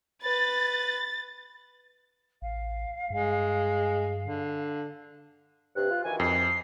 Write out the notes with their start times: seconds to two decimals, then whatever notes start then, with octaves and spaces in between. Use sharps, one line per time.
0.23 B4 A6
2.42 A1 F5
3.10 G2 G#3
4.26 D3
5.76 G2 C3 F#6
5.91 F4
6.04 D2 D#3 E3 G#5
6.20 F2 C7